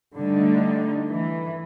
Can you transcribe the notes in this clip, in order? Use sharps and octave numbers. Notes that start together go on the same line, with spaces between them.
D3 G3 A3 D#4
E3